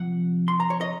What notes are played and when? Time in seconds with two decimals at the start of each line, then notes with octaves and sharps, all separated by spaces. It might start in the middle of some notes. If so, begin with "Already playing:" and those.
Already playing: C3 F3 F#5
0.48 C6
0.60 A#5
0.70 C#5
0.81 D#5